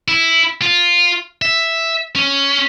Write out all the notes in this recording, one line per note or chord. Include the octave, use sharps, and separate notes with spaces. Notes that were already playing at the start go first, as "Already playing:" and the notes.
E4
F4
E5
C#4